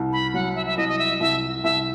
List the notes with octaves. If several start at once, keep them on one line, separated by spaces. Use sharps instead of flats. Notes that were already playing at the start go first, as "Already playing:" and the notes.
Already playing: C2
B5
F#3 F#5
E5
E5
C2 D#5
D#5
E5
C2 E5
C2 E5